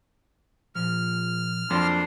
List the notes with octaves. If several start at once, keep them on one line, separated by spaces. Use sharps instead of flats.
A#2 F3 F6
F2 F#3 A#3 D4 C6